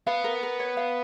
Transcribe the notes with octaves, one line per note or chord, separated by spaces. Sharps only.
B3 F5
A#4
A#4
C#5
F5